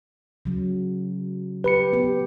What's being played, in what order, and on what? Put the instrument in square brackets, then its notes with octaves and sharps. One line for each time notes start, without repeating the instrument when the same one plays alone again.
[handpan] C#3 F#3
[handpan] G4 [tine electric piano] B4 B5 C#7
[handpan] B3 G4